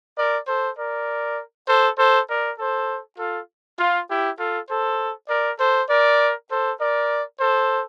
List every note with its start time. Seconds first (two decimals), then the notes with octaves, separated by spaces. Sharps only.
0.17 A#4 D5
0.48 A4 C5
0.77 A#4 D5
1.67 A4 C5
1.98 A4 C5
2.28 A#4 D5
2.58 A4 C5
3.18 F4 A4
3.79 F4
4.09 E4 G4
4.38 F4 A4
4.69 A4 C5
5.29 A#4 D5
5.59 A4 C5
5.89 A#4 D5
6.50 A4 C5
6.80 A#4 D5
7.39 A4 C5